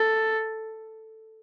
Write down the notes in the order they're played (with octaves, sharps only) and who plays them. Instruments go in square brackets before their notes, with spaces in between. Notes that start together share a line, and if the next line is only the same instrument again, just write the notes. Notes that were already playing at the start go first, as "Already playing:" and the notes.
Already playing: [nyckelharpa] A4